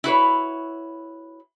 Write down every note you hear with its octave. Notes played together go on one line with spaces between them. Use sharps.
E4 F#4 B4 C#5